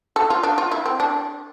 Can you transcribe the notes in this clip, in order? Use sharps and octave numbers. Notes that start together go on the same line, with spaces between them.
A4
F4
D4
F4
E4
C4
D4